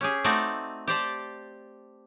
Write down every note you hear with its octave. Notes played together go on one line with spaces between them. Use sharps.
C#4 G4 G#4
A3 C4 D#4 F#4 D5 D#5
G4 C5 D5 A5